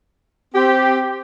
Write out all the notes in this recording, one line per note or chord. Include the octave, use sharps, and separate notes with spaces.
C4 G4